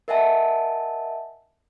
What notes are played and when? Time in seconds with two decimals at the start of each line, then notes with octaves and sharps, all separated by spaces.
0.08 A#4 D#5 E5 F#5 G#5 A5